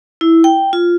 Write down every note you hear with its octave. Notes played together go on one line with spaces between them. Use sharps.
E4
G5
F4